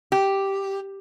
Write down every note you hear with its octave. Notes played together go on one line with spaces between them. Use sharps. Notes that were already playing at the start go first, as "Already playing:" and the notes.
G4